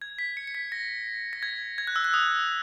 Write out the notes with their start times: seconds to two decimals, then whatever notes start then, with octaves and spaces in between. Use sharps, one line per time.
0.02 G#6
0.19 B6
0.37 C#7
0.47 C#7
0.55 B6
0.72 A#6
1.33 A#6
1.43 G#6
1.78 G#6
1.87 F#6
1.96 E6
2.04 F#6
2.14 D#6